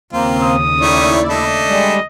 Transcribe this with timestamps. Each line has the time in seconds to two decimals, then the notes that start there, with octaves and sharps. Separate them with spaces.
0.13 D#2 C#3 A#3 C4 F4
0.42 D#6
0.82 D#3 A3 E4 C#5 D5
1.29 A3 D4 D#5
1.68 G3 G#3